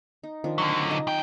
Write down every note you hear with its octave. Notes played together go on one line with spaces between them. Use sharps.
D#4
D#3 F3 D4
D3 F#3
D#4
F#2 G5